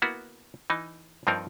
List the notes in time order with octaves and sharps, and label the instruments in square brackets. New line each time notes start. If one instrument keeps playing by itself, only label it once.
[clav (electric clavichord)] A#3 B3 E4 F#4
E3 D#4
G2 F3 C4 D#4 A#4